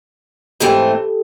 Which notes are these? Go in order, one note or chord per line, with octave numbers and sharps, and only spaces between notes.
G#2 E3 A3 C4 G4 A4